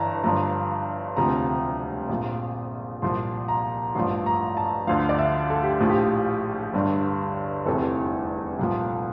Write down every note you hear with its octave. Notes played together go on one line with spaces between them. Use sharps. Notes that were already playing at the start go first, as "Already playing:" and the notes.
Already playing: G1 G2 E3 A5 A#5
G1 G2 F3 A#5
E1 D2 C3 F3 A#5
A#1 A#2 F3
C2 A#2 F3 C6
A#5
A1 G2 F3 C6
A#5
A5
D2 D3 F3 F5
D5
E5
A4
G4
A#1 A2 F3
G4
G1 G2 D3
F1 E2 C3 E3 A4
C2 A#2 F3